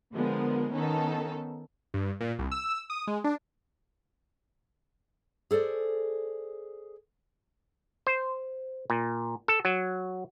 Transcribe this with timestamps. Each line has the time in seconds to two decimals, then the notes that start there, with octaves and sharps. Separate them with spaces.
0.13 D3 F3 G#3 B3 A#4
0.72 D#3 B3 C#4 D#4 A4
1.94 G2
2.21 A#2
2.39 C2
2.51 E6
2.90 D#6
3.07 G#3
3.24 D4
5.51 G#4 A4 C5 D5
8.07 C5
8.90 A#2
9.48 A4
9.65 F#3